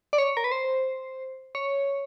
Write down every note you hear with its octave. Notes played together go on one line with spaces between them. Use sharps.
D5
C#5
A#4
B4
C5
C#5